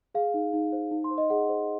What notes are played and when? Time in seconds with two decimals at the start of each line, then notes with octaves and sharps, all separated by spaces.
0.15 G#4 F5
0.34 D#4
0.53 D#4
0.72 C5
0.91 D#4
1.04 C6
1.11 C5
1.18 D#5
1.30 G#4 F#5
1.49 C5